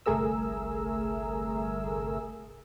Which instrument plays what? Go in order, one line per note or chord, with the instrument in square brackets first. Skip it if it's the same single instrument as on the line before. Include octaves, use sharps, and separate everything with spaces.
[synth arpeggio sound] G1 C2 A3 G#4 A#4 E6